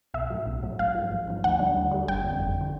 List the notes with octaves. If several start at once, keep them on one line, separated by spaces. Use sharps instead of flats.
B1 E5
A2 F#3
B1
A2 F#3
A1 F5
G#2 F3
A1
G#2 F3
D#2 F#5
D3 G3
D#2
D3 G3
G1 G5
F2 D3
G1
D3